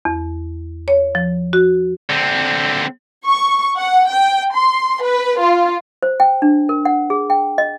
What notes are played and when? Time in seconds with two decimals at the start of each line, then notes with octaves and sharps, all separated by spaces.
0.05 E2
0.88 C#5
1.15 F3
1.53 F#4
2.10 D3 C4
3.26 C#6
3.77 F#5
4.09 G5
4.55 C6
5.02 B4
5.40 F4
6.03 C5
6.20 G5
6.42 D4
6.69 A#4
6.85 F#5
7.10 G#4
7.30 G5
7.58 D#5